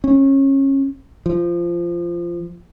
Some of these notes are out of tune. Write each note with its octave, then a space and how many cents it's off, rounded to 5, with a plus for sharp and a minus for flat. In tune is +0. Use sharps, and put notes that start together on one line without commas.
C#4 -25
F3 -15